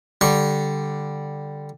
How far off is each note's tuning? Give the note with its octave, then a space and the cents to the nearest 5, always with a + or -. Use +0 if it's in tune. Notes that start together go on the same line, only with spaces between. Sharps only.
D3 +0 G3 +0 C#6 -25